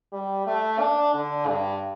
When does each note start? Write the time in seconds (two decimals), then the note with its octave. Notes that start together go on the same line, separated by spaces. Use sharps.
0.12 G3
0.46 A3
0.79 D4
1.14 D3
1.48 G2